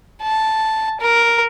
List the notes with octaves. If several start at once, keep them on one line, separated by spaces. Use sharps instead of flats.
A5
A#4